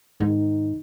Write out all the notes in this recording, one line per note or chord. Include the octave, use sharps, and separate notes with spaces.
G#2 D#3